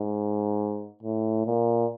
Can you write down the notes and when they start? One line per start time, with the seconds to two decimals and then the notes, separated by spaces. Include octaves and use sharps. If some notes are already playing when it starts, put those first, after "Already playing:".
Already playing: G#2
1.03 A2
1.46 A#2